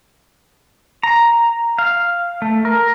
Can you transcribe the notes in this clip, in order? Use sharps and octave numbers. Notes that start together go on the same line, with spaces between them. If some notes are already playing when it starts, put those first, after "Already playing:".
A#5
F5
A3
A#4